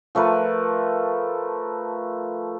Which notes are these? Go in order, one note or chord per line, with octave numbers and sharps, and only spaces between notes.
F3 A3 A#4 B4